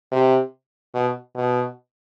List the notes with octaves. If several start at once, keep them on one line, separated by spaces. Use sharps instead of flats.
C3
B2
B2